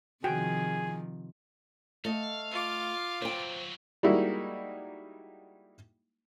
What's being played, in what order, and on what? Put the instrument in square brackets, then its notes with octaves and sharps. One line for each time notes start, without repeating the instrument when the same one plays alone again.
[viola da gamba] C3 D#3 F3 [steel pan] F#4 G5 [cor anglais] G#4
[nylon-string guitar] A3 D#5 [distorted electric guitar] F5
[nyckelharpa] F4 D6
[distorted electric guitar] F#3 C4 [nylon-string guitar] C5 G5
[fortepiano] G3 G#3 A#3 D#4 E4 F#4